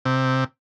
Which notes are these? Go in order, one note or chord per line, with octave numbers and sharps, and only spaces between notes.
C3